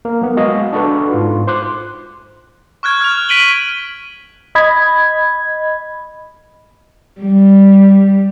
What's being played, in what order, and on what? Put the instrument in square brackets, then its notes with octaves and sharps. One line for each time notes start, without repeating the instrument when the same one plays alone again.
[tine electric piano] A#3 A#4
F#3 B3
G#3 F#4 D#5 F5
D4 F#4 A4 B4
G#2 F4
C5 C6 D6 F#6
[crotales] C#6 F6 F#6 G#6
F6 F7
B6 D7 D#7 F#7 G7
[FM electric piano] D#5 B5 G#6
[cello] G3